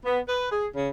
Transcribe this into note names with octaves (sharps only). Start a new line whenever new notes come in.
B3
B4
G#4
C#3